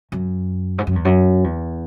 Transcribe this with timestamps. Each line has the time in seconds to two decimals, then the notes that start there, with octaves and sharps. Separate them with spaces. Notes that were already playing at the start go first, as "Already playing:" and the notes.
0.12 F#2
0.78 G#2
0.87 F#2
0.96 E2
1.05 F#2
1.44 E2